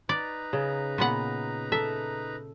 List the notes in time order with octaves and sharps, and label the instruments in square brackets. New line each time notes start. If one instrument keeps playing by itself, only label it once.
[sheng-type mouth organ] D#4 B4 A#5 [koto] D5
[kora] C#3
[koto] A#2 B3 F#5
[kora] A4 [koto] E5